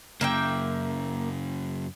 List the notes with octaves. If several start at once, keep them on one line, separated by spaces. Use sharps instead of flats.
F#2 C#3 A#3 E5 G5